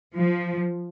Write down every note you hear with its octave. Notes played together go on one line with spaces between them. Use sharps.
F3